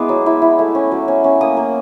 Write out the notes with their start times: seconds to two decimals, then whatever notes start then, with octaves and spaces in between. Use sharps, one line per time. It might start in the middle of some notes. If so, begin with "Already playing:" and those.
Already playing: G#3 B3 E4 D6
0.09 F#3
0.26 E4
0.42 E4
0.59 A3
0.75 C#4
0.92 F#3
1.08 C#4
1.24 C#4
1.41 A#3 D#6
1.57 A#3